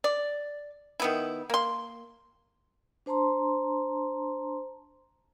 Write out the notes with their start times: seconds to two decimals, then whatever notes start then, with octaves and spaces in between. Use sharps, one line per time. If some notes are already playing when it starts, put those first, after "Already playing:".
0.04 D5
1.00 D#3 B3 E4
1.50 A#3 C6
3.06 D4 C5 A5 A#5 C6